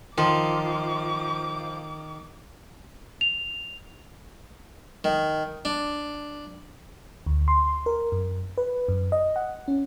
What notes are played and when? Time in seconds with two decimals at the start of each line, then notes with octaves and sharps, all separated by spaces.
0.18 D#3 F3 D6
3.21 F7
5.04 D#3
5.65 D4
7.26 D2
7.48 C6
7.86 A#4
8.12 F#2
8.58 B4
8.88 F#2
9.12 D#5
9.36 F#5
9.68 C#4